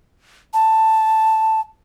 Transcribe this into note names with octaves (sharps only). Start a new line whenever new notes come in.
A5